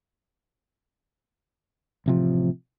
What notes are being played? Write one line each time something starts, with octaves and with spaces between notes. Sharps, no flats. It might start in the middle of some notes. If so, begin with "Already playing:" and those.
A1 C3 F3